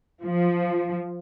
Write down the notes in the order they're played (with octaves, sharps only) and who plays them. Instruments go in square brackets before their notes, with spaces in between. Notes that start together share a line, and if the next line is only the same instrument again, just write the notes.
[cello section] F3